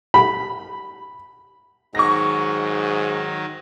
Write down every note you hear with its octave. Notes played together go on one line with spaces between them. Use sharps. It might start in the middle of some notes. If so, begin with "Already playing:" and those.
B5
G#2 D#3 F#3 D#4 C#6 A#6